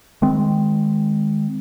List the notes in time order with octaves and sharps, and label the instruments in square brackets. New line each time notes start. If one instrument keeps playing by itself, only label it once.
[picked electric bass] D#3 G#3 C4